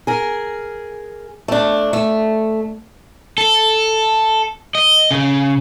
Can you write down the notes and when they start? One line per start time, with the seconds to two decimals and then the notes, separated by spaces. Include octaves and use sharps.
0.07 G#4 A#4
1.48 A3 D4
1.93 A3
3.38 A4
4.75 D#5
5.11 C#3